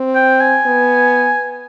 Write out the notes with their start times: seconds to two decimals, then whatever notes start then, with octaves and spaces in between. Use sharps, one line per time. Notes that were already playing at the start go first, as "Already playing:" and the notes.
Already playing: C4
0.15 G5
0.41 G#5
0.66 B3